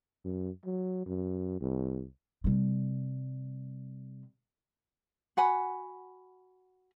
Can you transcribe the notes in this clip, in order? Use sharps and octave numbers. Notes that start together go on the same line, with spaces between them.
F#2
F#3
F#2
C2
C3 G3
F#4 F#5 G#5 B5